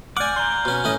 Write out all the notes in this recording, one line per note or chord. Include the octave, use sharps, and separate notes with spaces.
D5 F#5 G#5 D6 F6 G6
A#5 C6 F#6 G6 G7
B2 C#4
A2 C#4 D#5